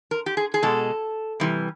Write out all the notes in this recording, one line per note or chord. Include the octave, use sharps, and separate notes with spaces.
A#4
G4
G#4
G#4
B2 G#3 A4
C3 E3 G3